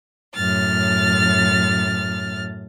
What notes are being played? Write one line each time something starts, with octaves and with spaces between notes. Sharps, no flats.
F#2 A2 F6 A6